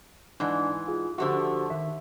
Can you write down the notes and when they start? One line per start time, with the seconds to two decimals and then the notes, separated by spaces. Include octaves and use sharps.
0.40 G#2 E3 D4 D5
0.88 F4 G#4
1.18 D3 F3 A3 F#4 G4 C5
1.70 D#3 E5